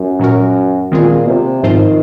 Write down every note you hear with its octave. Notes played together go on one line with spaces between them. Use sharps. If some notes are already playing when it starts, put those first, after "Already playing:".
Already playing: F#2
A#2 F#3 C#4 F#4 A#4
A#2 D#3 G#3 C4 F4 G#4
C3
G#2 D#3 F3 C4 F4 C5